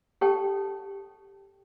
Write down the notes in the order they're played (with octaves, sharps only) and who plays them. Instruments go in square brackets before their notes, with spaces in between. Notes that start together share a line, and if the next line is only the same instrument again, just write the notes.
[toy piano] G4 A4 C#5 G5 A5